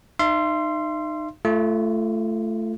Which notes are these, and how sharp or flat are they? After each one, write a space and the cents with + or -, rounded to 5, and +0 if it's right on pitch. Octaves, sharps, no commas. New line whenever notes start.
D#4 -25 E5 +45 C6 +0
A3 +0 F4 -30